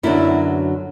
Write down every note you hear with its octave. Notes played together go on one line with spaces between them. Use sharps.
F#2 D3 F#3 B3 D4 E4